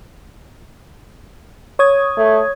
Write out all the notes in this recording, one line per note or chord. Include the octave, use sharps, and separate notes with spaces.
C#5 D#6 G#6
A3